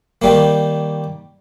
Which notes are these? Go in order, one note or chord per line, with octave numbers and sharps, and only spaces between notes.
D#3 G3 A#3